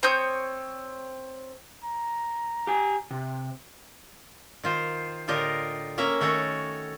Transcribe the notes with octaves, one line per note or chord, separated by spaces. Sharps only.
C4 C#5 D#6 G6
A#5
G4 G#5
C3
D#3 F4 C5
A2 D3 F4 G4 A#4 D#5
A#3 C#4 E5 A#5
D#3 A3 F#4 A4 C#5